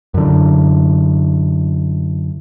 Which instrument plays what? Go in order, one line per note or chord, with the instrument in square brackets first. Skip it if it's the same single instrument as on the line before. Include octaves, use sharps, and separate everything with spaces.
[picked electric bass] F#2 D3